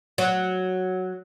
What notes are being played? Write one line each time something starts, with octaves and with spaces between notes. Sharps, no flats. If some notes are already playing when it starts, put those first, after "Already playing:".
F#3